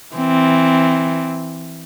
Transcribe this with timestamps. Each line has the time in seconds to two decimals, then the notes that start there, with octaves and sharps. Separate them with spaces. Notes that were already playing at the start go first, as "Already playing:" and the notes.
0.15 E3 C4